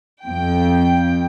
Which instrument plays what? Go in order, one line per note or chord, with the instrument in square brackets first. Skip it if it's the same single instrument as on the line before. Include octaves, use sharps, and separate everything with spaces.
[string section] F2 G5